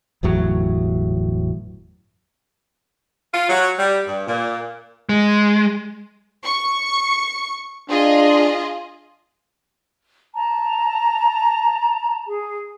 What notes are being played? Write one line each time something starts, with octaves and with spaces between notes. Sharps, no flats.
G1 E2 A2 F#3
F4
F#3
G3
G2
A#2
G#3
C#6 C#7
D4 F4 G#4 D#5
A5 A#5
G#4